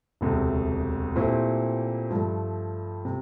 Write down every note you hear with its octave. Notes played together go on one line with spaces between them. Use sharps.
E1 D2 C3
A#2 A3 C4 E4 G4
G2 F3 A3
C3